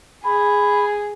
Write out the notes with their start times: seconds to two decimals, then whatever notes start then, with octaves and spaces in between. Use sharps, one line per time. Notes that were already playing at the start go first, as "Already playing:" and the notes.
0.24 G#4 B5